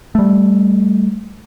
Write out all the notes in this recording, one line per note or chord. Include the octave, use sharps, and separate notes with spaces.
G3 A3